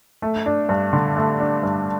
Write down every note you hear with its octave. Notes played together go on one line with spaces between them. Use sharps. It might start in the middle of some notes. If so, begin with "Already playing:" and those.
A3
D4
G2
D3
A3
D4
G2